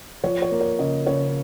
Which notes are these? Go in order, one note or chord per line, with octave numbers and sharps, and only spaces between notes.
F3 C#5
C#5
A#3
C#5
C#3 D#5
C#3 C#5